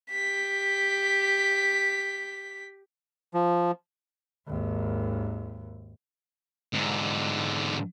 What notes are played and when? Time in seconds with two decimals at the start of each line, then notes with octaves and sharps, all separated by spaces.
0.11 G4 B6
3.34 F3
4.48 G#1 D#2
6.74 G#2 D3